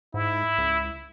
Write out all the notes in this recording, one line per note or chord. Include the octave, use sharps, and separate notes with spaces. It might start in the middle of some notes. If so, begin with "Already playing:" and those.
G#2 E4
C#2